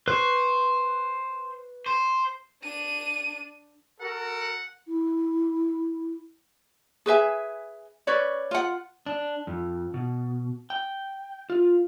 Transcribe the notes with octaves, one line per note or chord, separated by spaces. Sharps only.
B4 C5 C#6
C5
D4 D#7
F#4 A4 A#4 F#5
E4
G#4 B4 E5 G#5
C#4 B4 C#5 D5
F4 F#5
D4
F2
B2
G5
F4